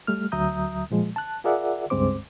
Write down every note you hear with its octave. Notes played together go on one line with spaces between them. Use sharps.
G3 A3 F6
D2 F#3 E5 A#5 D#6 G6
A#2 F3 G#3
A5 F#6
F4 G#4 A#4 D5 E5 F#5
C#2 G2 G#3 C4 C5 D6